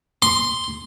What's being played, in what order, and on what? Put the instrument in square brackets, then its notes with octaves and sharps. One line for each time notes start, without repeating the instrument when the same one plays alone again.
[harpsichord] C6